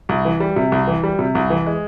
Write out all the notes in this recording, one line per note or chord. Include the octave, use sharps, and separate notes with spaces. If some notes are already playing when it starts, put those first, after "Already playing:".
C2
E3
G3
C3
C2
E3
G3
C3
C2
E3
G#3